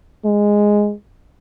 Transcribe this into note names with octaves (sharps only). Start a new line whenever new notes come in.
G#3